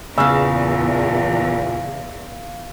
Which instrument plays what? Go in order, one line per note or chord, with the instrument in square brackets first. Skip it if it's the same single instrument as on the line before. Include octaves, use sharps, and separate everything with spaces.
[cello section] E2 [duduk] A#2 [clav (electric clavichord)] C#3 [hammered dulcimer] E5 F5